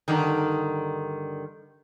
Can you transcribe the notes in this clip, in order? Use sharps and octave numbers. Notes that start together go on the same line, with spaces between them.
G2 D3 D#3